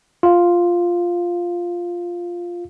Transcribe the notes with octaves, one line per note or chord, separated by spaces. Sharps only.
F4 F5